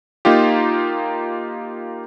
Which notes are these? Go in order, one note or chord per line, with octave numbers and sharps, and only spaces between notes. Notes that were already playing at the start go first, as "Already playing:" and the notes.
A#3 D#4 F4 G4